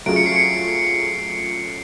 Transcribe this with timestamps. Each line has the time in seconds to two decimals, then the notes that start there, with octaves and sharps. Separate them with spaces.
0.06 F#3 A3 C#4 F4 G#4 D7
0.16 C#7
0.26 C7
0.36 C#7